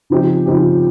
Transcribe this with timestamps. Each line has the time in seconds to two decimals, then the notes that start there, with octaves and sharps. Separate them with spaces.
0.10 C#3 F3 C4 D#4 G4
0.46 C#3 F3 C4 D#4 G4